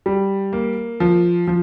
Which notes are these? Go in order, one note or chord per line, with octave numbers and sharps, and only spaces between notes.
G3
A#3
F3
F3